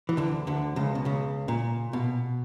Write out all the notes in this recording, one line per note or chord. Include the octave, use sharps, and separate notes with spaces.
E3
D2 D3
D2 D3
C#2 C#3
B2
C#2 C#3
A#2
B2